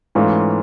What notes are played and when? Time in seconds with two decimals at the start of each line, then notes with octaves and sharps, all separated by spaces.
0.15 G#2 E3 A3 C#4 F4